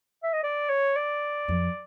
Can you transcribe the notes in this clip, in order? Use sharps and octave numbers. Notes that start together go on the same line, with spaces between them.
E5
D#5
D5
C#5
D5
F2